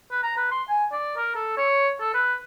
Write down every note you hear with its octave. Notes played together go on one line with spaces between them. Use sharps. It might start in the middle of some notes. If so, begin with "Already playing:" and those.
B4
A#5
B4
C6
G#5
D5
A#4
A4
C#5
A4
B4